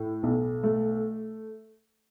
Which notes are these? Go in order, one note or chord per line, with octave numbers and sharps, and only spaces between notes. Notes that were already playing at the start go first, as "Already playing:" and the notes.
Already playing: A2
B1
A3